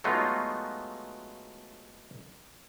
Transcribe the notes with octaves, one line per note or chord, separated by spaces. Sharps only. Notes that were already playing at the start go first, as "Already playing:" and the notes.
F#3 G#3 A3 B3 D#4 F4